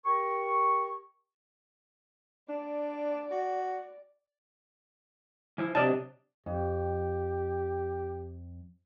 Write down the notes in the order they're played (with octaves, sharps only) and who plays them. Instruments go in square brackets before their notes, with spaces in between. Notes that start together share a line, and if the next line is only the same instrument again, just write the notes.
[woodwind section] G4 A#4 C#6
[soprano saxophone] D4 [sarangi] D5
[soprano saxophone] F#4
[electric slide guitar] E3 F3 E4
[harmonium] C3 [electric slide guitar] F#3 D4 D#5 [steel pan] D5 A5
[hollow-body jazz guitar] F2 [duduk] G4